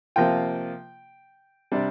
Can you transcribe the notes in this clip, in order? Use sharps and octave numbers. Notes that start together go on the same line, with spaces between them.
C3 F3 A#3 F4 G5
C3 G3 D4